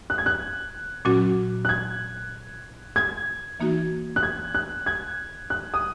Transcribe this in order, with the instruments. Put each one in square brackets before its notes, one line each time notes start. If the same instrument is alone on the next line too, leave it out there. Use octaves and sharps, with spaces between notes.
[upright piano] F#6
G#6
F#6
[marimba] A#2 F#3 C#4 F#4
[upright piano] F#6
G#6
G#6
[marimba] E3 A#3 D#4 F#4
[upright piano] F#6
G#6
F#6
G#6
F#6
D#6